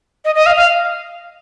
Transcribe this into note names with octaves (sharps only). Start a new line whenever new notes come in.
D#5
D#5
F5
F5